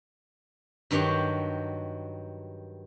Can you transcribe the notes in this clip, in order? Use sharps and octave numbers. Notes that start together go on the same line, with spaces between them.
G2 D#3 F#3 G4 C#5